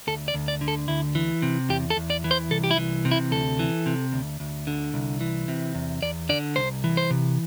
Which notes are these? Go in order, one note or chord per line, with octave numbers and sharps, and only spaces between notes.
D2 A4
D5
D2
D5
D3
A4
D2 E4
E3
C3
E2 G4
A4
E2
D5
E3
C5
C2 A4
G4
E4
E3
C3
E4
D2 A4
E3
C3
D2
D2
D3
C2
E3
C3
E2
E2 D5
D3 D5
C2 C5
E3
C5
C3